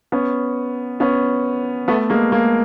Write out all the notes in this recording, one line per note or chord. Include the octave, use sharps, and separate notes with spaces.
B3 C#4
B3 C#4
A3 B3
G#3 A#3
G#3 A#3